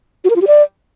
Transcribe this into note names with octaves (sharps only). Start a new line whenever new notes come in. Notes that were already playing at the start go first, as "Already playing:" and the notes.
F#4
A#4
F4
G4
D5